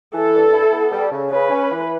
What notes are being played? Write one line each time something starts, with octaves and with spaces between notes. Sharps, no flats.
E3 A4
G2
E4
B3
G3
C#3
C#3 B4
C#4
E3